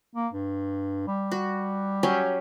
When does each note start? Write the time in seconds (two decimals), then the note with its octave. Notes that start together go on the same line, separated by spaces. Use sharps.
0.15 A#3
0.33 G2
1.08 G3
1.31 F#4
2.03 F#3 C#4 G4